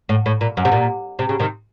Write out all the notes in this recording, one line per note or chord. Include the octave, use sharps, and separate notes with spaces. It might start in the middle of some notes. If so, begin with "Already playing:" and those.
A2
A2
A#2
F#2
C3
A#2
C3
C#3
C3 D#3